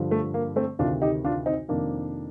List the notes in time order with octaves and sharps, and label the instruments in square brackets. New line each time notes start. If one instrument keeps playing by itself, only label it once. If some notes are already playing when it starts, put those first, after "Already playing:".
Already playing: [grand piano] G2 D3 F3
A3
A#3
A3 C4
D2 C3 D#3 D4 F4
D#4 G4
D4 F4
C4 D#4
F2 C3 D#3 A#3 D4